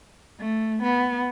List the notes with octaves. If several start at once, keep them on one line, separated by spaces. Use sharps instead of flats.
A3
B3